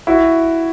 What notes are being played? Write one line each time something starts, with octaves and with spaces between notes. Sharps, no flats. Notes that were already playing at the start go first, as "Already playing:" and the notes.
E4 F#4